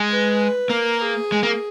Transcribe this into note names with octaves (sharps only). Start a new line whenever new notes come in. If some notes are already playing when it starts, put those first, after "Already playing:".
Already playing: G#3
B4
A#3 A#4
G#4
G#3
A#3